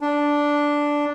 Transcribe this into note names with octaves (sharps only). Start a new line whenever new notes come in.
D4